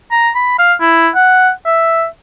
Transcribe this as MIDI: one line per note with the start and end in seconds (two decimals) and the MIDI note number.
0.11 0.30 82
0.35 0.56 83
0.58 0.74 77
0.81 1.09 64
1.15 1.51 78
1.65 2.05 76